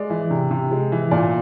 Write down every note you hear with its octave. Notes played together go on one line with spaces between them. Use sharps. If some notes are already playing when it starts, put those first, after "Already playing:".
Already playing: G#3 D5
E3
C3
C3
G#3
E3
A#2 D5